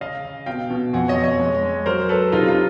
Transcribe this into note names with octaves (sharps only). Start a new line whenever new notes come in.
C#3 D#5 F5
C#3
B2 F5 G5
B2
F2 F#5 G#5
C#5 D#5
F2
C#5 D#5
G#3
G#3
F#3 A#4 C5
F#3 A4 B4
C3 D#4 F4
D#4 F4